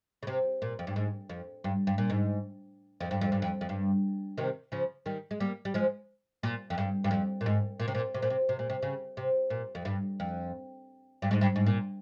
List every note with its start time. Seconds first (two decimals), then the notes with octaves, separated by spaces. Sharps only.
0.23 C#3
0.27 C3
0.62 A#2
0.79 F2
0.87 G2
0.96 G#2
1.29 F2
1.64 G2
1.87 G2
1.98 A#2
2.10 G#2
3.01 F2
3.11 G2
3.21 F2
3.32 G2
3.42 F2
3.61 F2
3.69 G2
4.38 C3 D#3
4.72 C#3 F3
5.06 D#3 G3
5.31 G#3
5.40 G3 A#3
5.65 G3
5.74 F3 G#3
6.43 A#2
6.70 F2
6.78 G2
7.04 G2
7.11 F2
7.41 A#2
7.46 G#2
7.80 A#2
7.88 C3
7.95 A#2
8.14 C3
8.22 A#2
8.30 C3
8.49 C3
8.59 A#2
8.70 C3
8.82 C#3
9.17 C3
9.50 A#2
9.75 F2
9.85 G2
10.20 F2
11.22 G2
11.31 G#2
11.41 G2
11.56 G#2
11.66 A#2